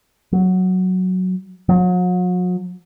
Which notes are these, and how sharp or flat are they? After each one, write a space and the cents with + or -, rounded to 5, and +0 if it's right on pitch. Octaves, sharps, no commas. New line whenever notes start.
F#3 +0
F#3 -40